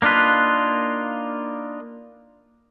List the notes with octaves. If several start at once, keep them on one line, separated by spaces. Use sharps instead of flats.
A#3 D4 D#4 F4 B4